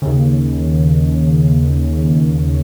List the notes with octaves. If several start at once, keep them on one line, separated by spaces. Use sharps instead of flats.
D#2 C#3